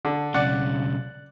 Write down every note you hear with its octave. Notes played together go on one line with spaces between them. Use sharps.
D3
B1 C#3 D5 F#5